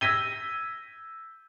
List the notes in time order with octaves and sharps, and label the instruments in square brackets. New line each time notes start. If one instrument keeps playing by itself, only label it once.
[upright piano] E6 G#6 A#6 B6 D#7 G7